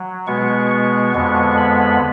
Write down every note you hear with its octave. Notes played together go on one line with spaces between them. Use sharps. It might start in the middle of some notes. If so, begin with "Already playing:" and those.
Already playing: F#3
B2 G#3 B3 C#6
C#6
F2 D3 G#3 B3 C#6
B5